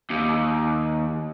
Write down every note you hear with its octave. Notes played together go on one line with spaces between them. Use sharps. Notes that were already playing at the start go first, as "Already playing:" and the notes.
D#2